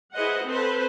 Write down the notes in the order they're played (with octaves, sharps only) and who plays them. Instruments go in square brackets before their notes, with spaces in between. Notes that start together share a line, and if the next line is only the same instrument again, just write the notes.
[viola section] E4 G#4 B4 C5 D#5 F#5
C4 A4 B4 C5